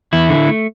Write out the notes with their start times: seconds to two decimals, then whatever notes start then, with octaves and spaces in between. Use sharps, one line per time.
0.13 E2 E4
0.29 D3
0.47 A3